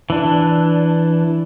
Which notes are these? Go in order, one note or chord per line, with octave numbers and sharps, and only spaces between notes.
E3 D4